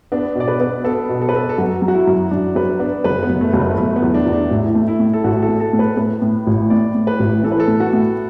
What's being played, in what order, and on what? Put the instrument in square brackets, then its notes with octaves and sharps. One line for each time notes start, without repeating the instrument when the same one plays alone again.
[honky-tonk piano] B3 [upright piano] D4
[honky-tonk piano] B2 [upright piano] D5
[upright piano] B4
[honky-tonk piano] B3
[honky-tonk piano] B3 [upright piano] A4
[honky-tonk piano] B2
[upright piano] A4
B4
[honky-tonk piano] B3 [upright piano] A4
[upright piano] A4
[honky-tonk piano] F#2 [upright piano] F#4
[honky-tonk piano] F#3
[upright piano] F#4
E4
[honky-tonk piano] F#2
[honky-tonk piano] F#2 [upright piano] D4
[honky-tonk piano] F#3 [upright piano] B4
[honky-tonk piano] B3 [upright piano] D4
[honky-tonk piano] F#1 [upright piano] B4
[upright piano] B3
[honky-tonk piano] F#1
[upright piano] A3
[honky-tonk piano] F#1
[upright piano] B3
B3
[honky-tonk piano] F#1 [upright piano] A3
[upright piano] B3
[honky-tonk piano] E2
[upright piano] D4
[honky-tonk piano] E2
[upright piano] D4
[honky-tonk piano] A1 [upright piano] E4
[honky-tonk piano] A3
[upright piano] E4
[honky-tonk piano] A2
[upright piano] A4
[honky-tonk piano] A1 [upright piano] F#4
[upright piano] A4
[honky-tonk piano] A3
[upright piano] A4
[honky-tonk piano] A2
[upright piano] B4
[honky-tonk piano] A2 [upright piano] B4
[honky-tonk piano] A2
A1
[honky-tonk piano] A2 [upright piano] D5
[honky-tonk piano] A2
[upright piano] B4
[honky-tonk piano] A1
[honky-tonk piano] E3 [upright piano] A4
[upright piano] B4
A4
[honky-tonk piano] A2
[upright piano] F#4
[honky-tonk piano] A2